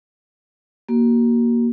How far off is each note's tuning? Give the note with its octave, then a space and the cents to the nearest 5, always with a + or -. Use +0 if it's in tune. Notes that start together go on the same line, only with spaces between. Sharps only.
A#3 +15 F#4 +35